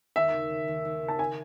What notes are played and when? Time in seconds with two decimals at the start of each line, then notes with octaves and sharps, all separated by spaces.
0.16 D#2 E5
0.33 C#3
0.50 C#3
0.68 D#2
0.85 D#2
1.02 C#3
1.08 A5
1.19 G#5